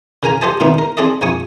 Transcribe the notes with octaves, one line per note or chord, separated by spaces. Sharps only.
C#3 A#4 G#5 A#5
G4 A4 C5 D#5 G#5 A5
A2 D#3 B3 C4 D4 D#4
A#4
C4 G#4 A4 D5 D#5
A#1 F2 G#5 C#6 D#6